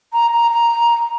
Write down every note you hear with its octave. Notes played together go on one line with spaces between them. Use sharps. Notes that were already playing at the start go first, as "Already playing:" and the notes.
A#5
A#5
A#5